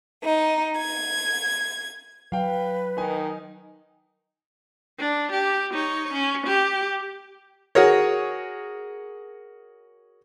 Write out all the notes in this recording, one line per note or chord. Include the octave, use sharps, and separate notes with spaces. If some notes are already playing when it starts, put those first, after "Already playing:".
D#4
G#6
F#3 B4 F5 G5
D#3 D#4 G#5
D4
G4
D#4 C#5
C#4
G4
F#4 G#4 A#4 C#5